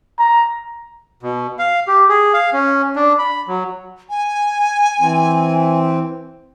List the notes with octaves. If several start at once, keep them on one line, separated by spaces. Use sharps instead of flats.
A#5
B2
F5
G4
G#4
F5
C#4
D4
B5
F#3
G#5
E3 C4